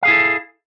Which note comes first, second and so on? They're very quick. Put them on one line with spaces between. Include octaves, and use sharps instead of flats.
F5 G#4 E4 A4